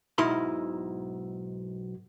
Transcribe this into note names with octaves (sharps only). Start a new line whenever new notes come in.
B1 G#2 D#4 E4 B5 C6